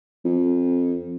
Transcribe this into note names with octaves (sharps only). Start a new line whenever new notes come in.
F2